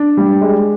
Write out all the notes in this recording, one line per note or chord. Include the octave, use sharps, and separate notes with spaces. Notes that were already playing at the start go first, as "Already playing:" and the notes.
Already playing: D4
G3
G#3